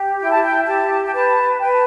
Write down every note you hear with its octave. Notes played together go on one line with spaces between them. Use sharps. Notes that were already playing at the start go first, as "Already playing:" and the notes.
Already playing: G4
E4 G5
A5
G5
G4 A5
G5
B4 A5
B4 G5
A5